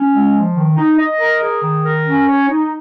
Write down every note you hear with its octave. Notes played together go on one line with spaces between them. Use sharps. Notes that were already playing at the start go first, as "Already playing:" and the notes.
Already playing: C#4
G#3
F3
D#3
D#4
D#5
A#4
G#4
D#3
A#4
C#4
C#5
D#4